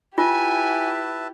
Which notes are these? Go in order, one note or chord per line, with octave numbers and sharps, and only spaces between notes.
E4 F4 G4 B4 E5 G#5 A5